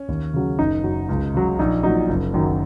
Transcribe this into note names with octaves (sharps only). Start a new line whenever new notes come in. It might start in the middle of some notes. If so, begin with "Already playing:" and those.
Already playing: C#4
D#2
C#3 F#3
F#1 D#4
F#2 F#3
C#2
C#3 F#3
A#1 D#4
A#2 F#3 D#4
F#1
F#2 D#3 F#3